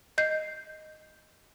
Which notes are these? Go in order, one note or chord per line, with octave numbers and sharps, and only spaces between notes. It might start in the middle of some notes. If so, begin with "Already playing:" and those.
D#5 G6 C7